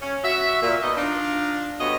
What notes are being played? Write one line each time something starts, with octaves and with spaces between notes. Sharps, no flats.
C#4
F#4 E5
A#2
B2 B3 D#4 D#5
D4 D#4 F4
D2 B2 G3 B3 C#5 D#5